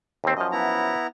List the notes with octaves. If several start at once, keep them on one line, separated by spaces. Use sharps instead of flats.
D#2 C4
F#2 F3 D#5
B3 E4 A#5